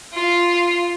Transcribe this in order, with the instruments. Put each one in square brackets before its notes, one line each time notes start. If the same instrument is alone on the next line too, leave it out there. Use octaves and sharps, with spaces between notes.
[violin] F4